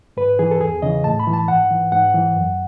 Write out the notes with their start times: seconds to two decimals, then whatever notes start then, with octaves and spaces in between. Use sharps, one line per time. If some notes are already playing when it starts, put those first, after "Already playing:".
0.17 G#2 B4
0.39 E3 G#4
0.51 A4
0.60 E2 G#4
0.82 C#3 E3 D#5
1.04 A2 A5
1.20 B5
1.27 E3
1.33 A5
1.48 G#2 F#5
1.71 E3
1.92 G#2 F#5
2.15 E3
2.36 F#2